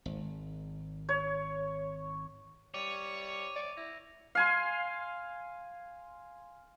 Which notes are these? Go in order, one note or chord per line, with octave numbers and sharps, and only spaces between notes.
G#1
C#5
G3 C#5 D6 D#7 F7
D5
E4 A#6
F5 G#5 C6